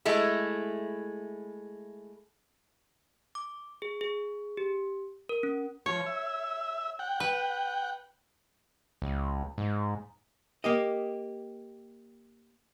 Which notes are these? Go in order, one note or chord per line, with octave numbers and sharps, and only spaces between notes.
G#3 A3 E4
D6
G#4
G#4
G4
A#4
C#4
F3 C#5
E5
F#5 G5
B4
C#2
G#2
A#3 G4 D#5